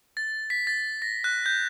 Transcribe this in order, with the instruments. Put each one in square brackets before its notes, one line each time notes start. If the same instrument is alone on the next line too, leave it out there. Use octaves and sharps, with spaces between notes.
[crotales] A6
B6
A6
A#6
F#6
G6